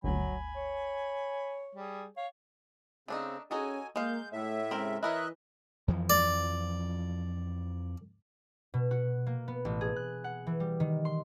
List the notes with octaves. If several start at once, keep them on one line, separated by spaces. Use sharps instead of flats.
G1 D2 F#3 G#5 B5
C#5
G3 G#4
C#5 F5
C#3 A3 C4 D4 D#4
C#4 D#4 F#4 G#4 A4 G#5
G#3 A#3 F5 G6
A2 A3 C#5 E5
C#3 G#3 C4 A#4
E3 E4 A#4 C#5 D#5 E5 F#6
F2 E3 F3
D5
B2
F#4
A#3
B3
A1
G#4
F#6
F#5
E3
G3
D#3
C6